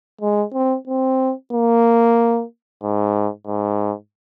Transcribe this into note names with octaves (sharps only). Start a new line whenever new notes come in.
G#3
C4
C4
A#3
G#2
G#2